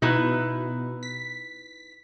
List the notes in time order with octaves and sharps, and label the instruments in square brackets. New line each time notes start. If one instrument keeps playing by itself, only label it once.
[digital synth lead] B2 [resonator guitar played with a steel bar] D#4 E4 B4
[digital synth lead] B6